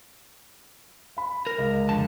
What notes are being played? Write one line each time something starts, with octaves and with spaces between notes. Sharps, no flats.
F5 B5
A#4
C#2
F2 D3 A5